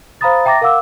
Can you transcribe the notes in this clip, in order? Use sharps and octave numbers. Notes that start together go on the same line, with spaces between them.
C5 F5 A#5 B5 D#6 A6
E5 G5 A#5 D6 A6 A#6
A#4 F5 F#5 D6 E6